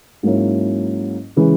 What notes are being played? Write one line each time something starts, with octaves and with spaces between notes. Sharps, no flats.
G#2 F#3 A#3 C#4 E4
C#3 E3 G#3